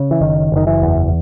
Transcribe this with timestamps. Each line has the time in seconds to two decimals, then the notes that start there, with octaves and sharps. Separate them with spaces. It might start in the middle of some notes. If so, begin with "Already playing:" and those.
Already playing: C#3
0.11 E3
0.21 F#1 D#3
0.52 F#1 D#3
0.67 E3
0.82 E2